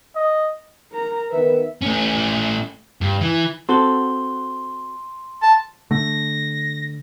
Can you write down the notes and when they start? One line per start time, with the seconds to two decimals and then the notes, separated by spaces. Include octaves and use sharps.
0.16 D#5
0.92 A#4 A#5
1.31 D#3 B3 A#4 B4 E5
1.82 A3 C#4
3.01 G2
3.21 E3
3.69 C4 F#4 A4 C6 G7
5.43 A5
5.91 D3 A3 A#6